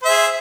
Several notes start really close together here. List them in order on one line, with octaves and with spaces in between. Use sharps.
C5 E5 G#4